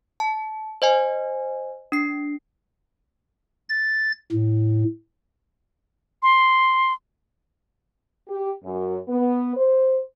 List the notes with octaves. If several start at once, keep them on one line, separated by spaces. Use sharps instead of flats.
A5
C5 D#5 G#5
D4 C7
A6
A2
C6
G4
F#2
B3
C5